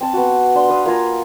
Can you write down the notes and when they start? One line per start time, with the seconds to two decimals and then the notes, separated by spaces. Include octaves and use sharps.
0.01 C4 A5
0.13 B3 F#4
0.55 D4 C6
0.70 B4 F5 D#6
0.86 A#3 F4 G#5 A#5